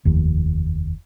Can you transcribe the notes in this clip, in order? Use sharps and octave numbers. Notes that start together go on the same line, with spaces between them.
F1 D#2